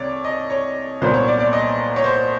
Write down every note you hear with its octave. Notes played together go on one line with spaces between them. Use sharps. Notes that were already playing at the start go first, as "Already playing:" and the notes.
Already playing: C2 C3 C#5 D5
D#5
C#5
C2 A#2 F#3 B3 D4 C5
C#5
D5
D5
D#5
C#5
C5